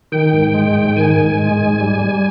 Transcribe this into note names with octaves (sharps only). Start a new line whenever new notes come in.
D#3 G5
G#2
G#3
G#2
D#3 G#5
G#2
G#3
G#2
G3
G3